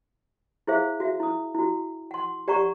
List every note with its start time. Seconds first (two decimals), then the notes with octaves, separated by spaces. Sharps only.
0.67 E4 G#4 C5 E5 F5
1.00 F#4 E5
1.20 E4 D#6
1.55 E4 F#4
2.11 F#5 C6
2.48 G4 D5 F#5 A#5 C#6